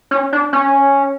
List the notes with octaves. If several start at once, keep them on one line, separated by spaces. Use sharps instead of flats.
C#4
D4
C#4